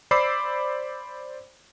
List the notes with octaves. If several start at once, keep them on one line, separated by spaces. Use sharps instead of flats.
C5 D5 B5 D6 E6 C7